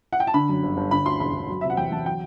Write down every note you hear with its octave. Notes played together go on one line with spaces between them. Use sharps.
F#5
G5
A5
D3 B5
F#2
G1
G1
D3 B5
D2 C6
E1 B5
E1
F#3
C3 E5
F#5
E2 G5
E2 A5
F#3 G5